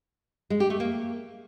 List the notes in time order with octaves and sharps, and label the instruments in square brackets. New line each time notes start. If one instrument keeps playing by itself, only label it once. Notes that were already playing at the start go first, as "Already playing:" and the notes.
[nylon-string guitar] G#3
G4
A3
A#3